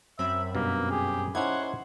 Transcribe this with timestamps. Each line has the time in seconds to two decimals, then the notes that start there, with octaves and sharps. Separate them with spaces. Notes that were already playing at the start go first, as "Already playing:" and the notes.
0.19 F#2 C4 E5 B5
0.55 G2 B2 A#3
0.91 G4 G#4
1.35 C#4 D#4 E4 C5 F#5 G#6